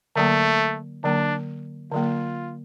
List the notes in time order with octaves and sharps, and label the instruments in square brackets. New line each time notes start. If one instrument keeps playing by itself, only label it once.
[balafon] D3 F#3 A#3 [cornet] A3
[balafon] D3 F#3 A#3 [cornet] D4
[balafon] D3 F#3 A#3 [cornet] F4